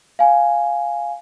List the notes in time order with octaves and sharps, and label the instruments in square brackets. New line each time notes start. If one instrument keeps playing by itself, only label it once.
[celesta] F5 G#5